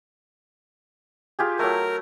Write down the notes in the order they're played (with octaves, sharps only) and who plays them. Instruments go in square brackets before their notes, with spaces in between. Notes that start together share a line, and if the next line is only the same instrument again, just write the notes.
[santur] F4 G4 G#4
[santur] F#3 A3 [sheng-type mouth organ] A#4